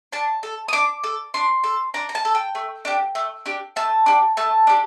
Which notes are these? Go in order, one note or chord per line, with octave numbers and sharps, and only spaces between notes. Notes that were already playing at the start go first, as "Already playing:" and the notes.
D4 A5
A4
D#6
D4 D6
A4
D4 C6
A4
D4 A#5
A#5
A5
A4
G5
A3
D4 G4
A3
D4 G4
A3 A5
D4 G4
A3 A5
D4 G4